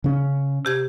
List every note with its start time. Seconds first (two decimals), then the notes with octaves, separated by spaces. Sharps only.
0.04 C#3 C#4
0.65 C3 G4 G#6